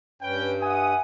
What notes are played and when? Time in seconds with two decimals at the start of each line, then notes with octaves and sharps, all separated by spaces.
0.22 G2 C#4 B4 G5
0.62 E5 F#5 G#5 D#6